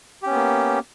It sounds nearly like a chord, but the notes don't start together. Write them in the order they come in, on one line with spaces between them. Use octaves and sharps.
G4 C#4 B3 A#3